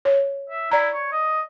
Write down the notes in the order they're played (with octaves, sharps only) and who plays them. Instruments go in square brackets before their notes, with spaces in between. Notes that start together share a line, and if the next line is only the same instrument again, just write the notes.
[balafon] C#5
[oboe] E5
[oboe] E4 [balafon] D5 A#5
[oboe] C#5
D#5